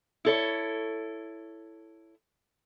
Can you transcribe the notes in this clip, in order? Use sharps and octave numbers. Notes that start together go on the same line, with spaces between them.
E4 A4 C#5